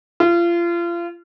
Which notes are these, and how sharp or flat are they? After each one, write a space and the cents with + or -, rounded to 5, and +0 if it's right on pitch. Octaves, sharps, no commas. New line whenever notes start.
F4 -30